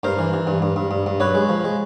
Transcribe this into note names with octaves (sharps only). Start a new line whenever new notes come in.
G2 A#4 C5
E3
E3
G2
G2
G2
G2
G2
F#2 B4 C#5
G#3
F3
G#3